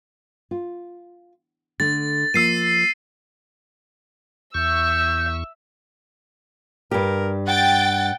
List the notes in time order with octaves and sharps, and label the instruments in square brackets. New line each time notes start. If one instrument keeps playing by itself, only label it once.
[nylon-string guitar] F4
[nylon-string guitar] D3 A3 [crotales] A6
[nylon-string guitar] F3 A#3 [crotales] E6 C7 D#7
[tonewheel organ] E2 C#6 [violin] E5 E6 [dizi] G6
[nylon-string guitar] G2 G4 [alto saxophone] A#4
[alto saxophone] F#5 [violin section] G5 A6